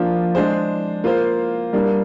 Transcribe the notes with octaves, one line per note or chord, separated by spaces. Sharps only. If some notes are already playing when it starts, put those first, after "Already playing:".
Already playing: F3 A#3 D4 F4
G#3 D4 G#4 C5
A#3 F4 C5
G3 A#3 D4